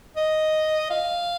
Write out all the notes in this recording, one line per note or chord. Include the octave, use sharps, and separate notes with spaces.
D#5
F5